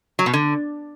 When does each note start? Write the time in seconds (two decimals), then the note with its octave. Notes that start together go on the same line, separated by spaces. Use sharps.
0.19 F#3
0.26 B2
0.33 D3